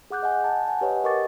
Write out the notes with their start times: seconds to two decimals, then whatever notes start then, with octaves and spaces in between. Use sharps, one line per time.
0.10 G#4 F#5 D6 F#6 G6
0.23 D#5 F#5 G#5
0.44 A5
0.68 F#5 G#5
0.81 G4 B4 C#5 D#5 F#5 G5
1.03 G4 A#4 D#5 C#6 D6 A6